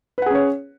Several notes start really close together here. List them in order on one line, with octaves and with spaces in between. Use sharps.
B4 F#5 G#4 C#4 C#5